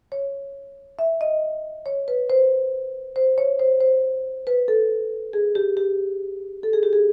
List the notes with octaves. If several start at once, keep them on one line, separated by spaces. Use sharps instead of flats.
C#5
E5
D#5
C#5
B4
C5
C5
C#5
C5
C5
B4
A4
G#4
G4
G4
A4
G#4
G4
G#4